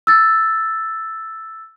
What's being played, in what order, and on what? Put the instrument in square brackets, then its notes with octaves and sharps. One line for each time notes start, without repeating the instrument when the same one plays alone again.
[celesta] E6 A6